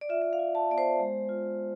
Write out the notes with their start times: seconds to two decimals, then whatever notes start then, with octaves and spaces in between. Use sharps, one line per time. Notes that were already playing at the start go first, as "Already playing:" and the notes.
0.01 D5
0.09 F4 E5
0.22 E5
0.33 F5
0.39 F4
0.55 A5
0.70 B3 D5
0.78 C5
0.99 G#3
1.29 F4